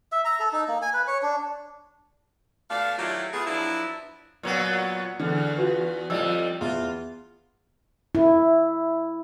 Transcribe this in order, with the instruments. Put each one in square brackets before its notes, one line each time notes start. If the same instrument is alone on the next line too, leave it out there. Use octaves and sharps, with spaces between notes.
[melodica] E5
A#5
A4
D#4
A#3
G#5
B4
C#5
D4
[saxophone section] B2 A3 D4 D5 F5
D#3 F#3 A3 E4 F4 G4
A3 B3 F4 G#4
F3 F#3 B3 D4 E4
[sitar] A#2 F#3 B3
[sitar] E2 [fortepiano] D3
[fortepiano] F4 F#4 B4
[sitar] F2 G3 [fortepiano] F3 D5 E6
[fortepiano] E2 [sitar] F4
[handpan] E4